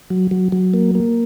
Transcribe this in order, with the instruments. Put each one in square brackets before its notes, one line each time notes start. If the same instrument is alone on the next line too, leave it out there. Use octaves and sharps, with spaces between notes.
[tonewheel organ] F#3
F#3
F#3
A#3
A#3